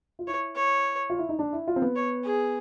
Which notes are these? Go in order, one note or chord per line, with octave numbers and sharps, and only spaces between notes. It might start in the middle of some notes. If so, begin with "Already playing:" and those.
F4
E4 C#5
C#5
F4
E4
D#4
D4
E4
F4
C4
B3
C#5
G#4